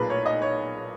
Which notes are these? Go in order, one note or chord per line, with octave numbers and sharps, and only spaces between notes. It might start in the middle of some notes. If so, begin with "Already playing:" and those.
Already playing: B1 A#2 A#3 G#4 B4
C#5
D#5
C#5